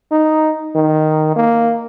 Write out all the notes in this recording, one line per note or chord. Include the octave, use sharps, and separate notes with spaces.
D#4
D#3
A#3